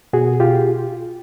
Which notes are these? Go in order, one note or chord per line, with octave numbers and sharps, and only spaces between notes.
B2 F#4 G#4
F4 G4